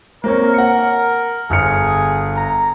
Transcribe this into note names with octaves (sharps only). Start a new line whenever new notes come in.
A#3 C4 A#4 C#5
F#5 C#7
G1 G#4 F6 C#7
A#5